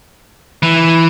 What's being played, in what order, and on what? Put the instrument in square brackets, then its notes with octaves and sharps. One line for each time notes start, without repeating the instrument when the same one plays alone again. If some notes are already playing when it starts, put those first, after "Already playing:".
[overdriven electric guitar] E3